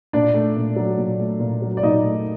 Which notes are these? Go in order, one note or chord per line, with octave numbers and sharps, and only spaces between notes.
A#2 D4 D5
A3
A#2
F#3
A#2
A3
A#2
F#3
D5
A#2 D#4 D#5
A3